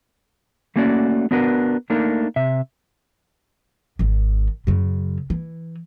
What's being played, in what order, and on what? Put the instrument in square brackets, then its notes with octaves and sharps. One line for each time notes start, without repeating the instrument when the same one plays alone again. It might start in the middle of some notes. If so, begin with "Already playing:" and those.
[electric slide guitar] A3 A#3 C#4 F#4 C#5 D5
B3 D4 F#4 A#4 B4
A3 A#3 D4 D#4 A#4
C3 E5
[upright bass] G#1 D#3
F#2 C#3
E3